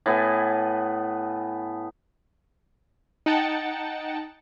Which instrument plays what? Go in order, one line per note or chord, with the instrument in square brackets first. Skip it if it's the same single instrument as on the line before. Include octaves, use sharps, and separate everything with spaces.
[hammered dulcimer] A2 B3 G#5
[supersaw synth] D#4 F#5 G5 A5 A6 C#7